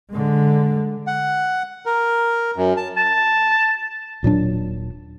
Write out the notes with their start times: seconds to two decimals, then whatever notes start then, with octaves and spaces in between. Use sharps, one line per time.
0.11 D3 G#3
1.07 F#5
1.86 A#4
2.56 F#2
2.77 A5
2.97 A5
4.23 D#1 A#2 F#3 D4